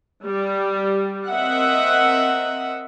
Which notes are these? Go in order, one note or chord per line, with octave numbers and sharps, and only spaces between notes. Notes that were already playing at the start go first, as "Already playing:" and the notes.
G3
C4 A#4 D#5 E5 F#5